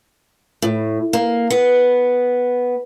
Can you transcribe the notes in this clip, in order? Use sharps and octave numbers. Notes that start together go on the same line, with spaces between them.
A2
A#3
B3